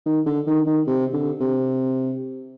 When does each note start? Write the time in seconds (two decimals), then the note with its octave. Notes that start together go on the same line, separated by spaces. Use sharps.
0.06 D#3
0.26 D3
0.47 D#3
0.67 D#3
0.87 C3
1.13 D3
1.40 C3